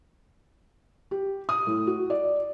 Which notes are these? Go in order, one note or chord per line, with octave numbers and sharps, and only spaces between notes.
G4
D#6
A2
F#4
D5